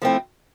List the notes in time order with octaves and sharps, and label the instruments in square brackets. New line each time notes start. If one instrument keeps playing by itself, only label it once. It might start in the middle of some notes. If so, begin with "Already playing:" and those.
[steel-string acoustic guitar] F3 A3 C4 E4